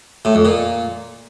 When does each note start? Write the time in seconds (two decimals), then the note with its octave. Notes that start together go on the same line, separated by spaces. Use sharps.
0.25 A2
0.35 F2
0.45 A#2